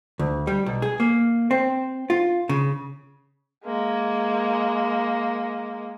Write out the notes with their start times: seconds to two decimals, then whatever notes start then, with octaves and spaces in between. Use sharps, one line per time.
0.19 D2
0.47 G3
0.66 B1
0.82 G#4
1.00 A#3
1.51 C4
2.10 F4
2.49 C#3
3.65 G#3 A#3